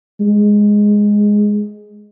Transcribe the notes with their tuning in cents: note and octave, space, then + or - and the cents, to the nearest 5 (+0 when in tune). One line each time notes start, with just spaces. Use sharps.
G#3 -5